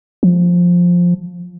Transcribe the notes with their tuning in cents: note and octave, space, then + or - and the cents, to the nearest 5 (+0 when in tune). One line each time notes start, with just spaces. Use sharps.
F3 +10